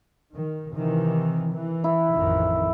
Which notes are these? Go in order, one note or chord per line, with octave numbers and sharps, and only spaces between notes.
D#3
C3 D#3 E3
E3
E4
A1 F2 D#3